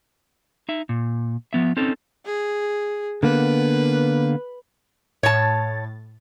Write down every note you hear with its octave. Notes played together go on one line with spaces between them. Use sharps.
D#4 E5
A#2
F3 B3 E5
C4 C#4 D#4 A4
G#4
D3 A#3 B3 B4
A2 C#5 A5 A6